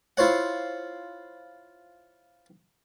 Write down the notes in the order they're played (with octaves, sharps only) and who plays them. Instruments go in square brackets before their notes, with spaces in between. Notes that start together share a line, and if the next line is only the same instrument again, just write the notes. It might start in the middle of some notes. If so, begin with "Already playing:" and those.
[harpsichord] E4 F4 C5 C#5 F#5